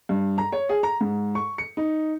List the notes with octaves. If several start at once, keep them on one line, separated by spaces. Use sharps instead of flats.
G2
A#5
C#5
G#4
A#5
G#2
C#6
C#7
D#4